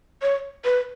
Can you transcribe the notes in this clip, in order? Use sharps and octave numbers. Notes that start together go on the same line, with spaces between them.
C#5
B4